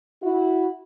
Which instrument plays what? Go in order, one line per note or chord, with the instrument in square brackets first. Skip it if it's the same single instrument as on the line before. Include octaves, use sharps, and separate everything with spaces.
[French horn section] E4 F#4